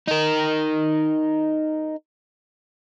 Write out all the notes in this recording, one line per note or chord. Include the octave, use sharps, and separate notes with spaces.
D#4 A#4